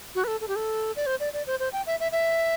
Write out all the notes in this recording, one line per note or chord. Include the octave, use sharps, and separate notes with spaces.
F#4
B4
A4
A4
G4
A4
D5
C5
D5
D5
C5
C5
G5
E5
E5
E5